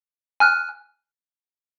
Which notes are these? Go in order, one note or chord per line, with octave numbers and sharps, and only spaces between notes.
G#5 F6 F#6